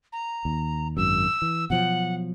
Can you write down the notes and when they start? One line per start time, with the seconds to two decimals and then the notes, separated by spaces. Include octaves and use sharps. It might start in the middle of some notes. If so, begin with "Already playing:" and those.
0.13 A#5
0.45 D#2
0.97 G#1 F#2 E6
1.42 E3
1.70 B2 F3 F#3 F#5